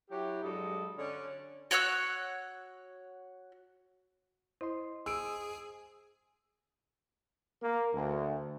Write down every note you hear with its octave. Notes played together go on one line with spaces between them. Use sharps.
F#3 E4 G4
G2 F#3 G#3 A4 D#5
D3 C#4
F#4 C#5 F#5 E6
E4 C5 D#5 C6
G#4 E6 D7
A#3
D2